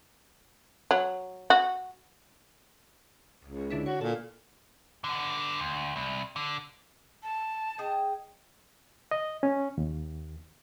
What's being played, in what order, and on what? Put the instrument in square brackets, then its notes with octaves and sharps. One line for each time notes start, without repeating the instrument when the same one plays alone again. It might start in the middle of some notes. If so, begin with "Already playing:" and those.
[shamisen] F#3
F#4
[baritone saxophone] C#2
[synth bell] D3 D4 E4
[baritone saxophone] F#4 [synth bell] C#5
[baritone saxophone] A#2 [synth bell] A4
[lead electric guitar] D3 B3
D2
C2
D3
[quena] A5
[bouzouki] G#4 D#5 G5
[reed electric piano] D#5
C#4
D#2